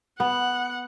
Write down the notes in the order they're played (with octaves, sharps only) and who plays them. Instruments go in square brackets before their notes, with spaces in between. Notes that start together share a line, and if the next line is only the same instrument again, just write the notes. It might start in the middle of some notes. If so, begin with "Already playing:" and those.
[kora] B3 [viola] F#5